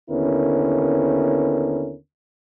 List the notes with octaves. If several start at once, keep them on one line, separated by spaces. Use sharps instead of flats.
D#2 D3 B3 C#4 E4 A#4